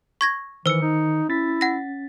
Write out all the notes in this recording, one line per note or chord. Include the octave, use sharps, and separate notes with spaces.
C#6 G#6 A#6
D#3 E3 C5 E6 C#7
D#4
C#4 E4 A6 B6
F#5 A#6